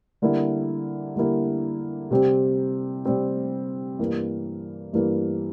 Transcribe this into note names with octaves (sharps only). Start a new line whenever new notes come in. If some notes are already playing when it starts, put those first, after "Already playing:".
D3 G3 A#3 E4
D3 G3 A#3 E4
C3 G3 C4 G4
C3 G3 C4 G4
G2 E3 A#3
G2 E3 A#3